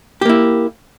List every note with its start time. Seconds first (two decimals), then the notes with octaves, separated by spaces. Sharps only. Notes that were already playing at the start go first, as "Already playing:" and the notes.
0.21 G4
0.25 A#3
0.29 E4